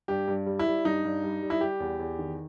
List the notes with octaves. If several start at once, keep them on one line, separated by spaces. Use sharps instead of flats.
G2 G4
G2
G3
E4
G3
G2 D#4
G2
G3
G3
E4
G3 G4
E2
E2
D#3